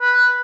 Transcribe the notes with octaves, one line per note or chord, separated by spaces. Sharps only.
B4